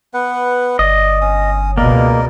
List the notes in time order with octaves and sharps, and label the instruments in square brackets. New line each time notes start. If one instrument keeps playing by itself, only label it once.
[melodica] B3 B4 F#5
[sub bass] G1 [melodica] D5 [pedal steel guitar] D#5
[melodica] C#4 D#6
[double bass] C#2 B2 [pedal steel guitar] A#3 [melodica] A#4 D5 D#5